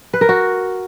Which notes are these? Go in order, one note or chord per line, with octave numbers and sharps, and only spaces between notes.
B4
A#4
F#4